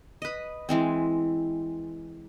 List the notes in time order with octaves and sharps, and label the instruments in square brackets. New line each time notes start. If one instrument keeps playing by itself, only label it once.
[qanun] B4 D#5
E3 G#3 C4